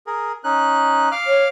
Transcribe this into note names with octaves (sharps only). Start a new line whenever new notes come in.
G#4 A#4
C#4 D#4 F#6
F5 D6 F6
C#5